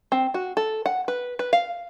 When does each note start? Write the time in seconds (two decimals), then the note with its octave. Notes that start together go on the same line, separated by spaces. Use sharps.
0.12 C4
0.34 F#4
0.57 A4
0.86 F#5
1.08 B4
1.39 B4
1.53 F5